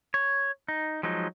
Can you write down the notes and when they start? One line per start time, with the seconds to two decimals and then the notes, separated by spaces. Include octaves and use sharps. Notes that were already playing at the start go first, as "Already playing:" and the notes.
0.14 C#5
0.68 D#4
1.03 F3 F#3 G#3 D#4